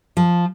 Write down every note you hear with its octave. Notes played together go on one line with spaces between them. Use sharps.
F3